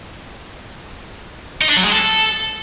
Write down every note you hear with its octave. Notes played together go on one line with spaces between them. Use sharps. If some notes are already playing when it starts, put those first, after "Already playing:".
D#4
D4
F#3
G#3
A4